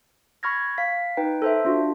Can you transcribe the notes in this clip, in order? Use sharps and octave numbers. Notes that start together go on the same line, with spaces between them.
B5 C#6 F6 G#6 A#6
F5 B6
D#4 B4 G5
A4 C5 E5
D4 F4 F#4